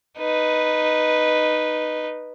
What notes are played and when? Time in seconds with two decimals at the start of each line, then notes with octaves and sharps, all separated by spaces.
0.19 D#4 B4